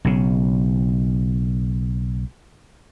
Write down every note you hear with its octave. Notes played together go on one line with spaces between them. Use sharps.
B1 C#3